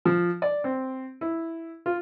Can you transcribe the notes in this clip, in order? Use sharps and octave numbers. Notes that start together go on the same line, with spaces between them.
F3
D5
C4
E4
F4